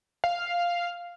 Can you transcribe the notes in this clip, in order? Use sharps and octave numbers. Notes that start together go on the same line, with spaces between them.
F5